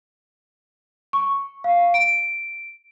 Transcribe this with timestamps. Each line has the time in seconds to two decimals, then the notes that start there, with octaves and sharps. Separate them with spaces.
1.13 C#6
1.64 F5
1.94 D7